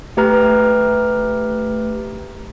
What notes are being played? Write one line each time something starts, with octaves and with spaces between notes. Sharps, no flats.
A3 G4 B4 A#5 F6